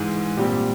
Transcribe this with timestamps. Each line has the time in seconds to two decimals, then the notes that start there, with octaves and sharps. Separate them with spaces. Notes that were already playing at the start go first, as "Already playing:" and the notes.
Already playing: G#2 E3 G#3
0.37 A#2 G3 C4 G4